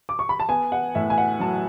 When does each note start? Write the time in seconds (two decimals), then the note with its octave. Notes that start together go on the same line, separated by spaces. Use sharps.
0.09 D6
0.19 C#6
0.29 B5
0.40 A5
0.49 B3 G#5
0.72 F#5
0.95 A2 E5
1.10 G#5
1.18 F#5
1.40 F#3 A5